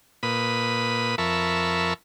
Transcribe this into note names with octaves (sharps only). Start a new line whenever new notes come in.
A#2 B4 B5 D#6
F2 A#4 E5 A5 B5 C#6